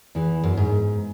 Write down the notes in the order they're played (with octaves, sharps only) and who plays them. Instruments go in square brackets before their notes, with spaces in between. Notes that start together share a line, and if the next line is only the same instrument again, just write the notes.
[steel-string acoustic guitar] E2 E3
F#2
G#2